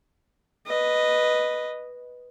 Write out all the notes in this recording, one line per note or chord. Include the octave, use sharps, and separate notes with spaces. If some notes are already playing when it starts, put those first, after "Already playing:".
B4 D#5